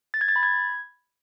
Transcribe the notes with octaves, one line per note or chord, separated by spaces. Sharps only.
A6
G#6
A6
B5
G#6